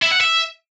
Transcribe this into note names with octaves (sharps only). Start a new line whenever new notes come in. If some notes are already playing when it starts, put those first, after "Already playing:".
E4
F#5
E5